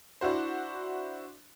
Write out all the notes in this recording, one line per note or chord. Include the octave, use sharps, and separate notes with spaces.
D4 E4 F#4 C5